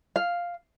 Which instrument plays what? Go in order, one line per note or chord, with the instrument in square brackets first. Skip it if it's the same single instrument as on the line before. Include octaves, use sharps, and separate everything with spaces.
[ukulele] F5